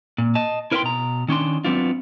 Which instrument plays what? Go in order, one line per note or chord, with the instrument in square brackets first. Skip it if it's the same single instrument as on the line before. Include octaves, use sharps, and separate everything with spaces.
[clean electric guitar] A#2
D#5 A5
E4 A#4 B4 D#5 G5 C6
B2 A#5
D#3 C#4 D4 C6
F#3 B3 C4 D4 F4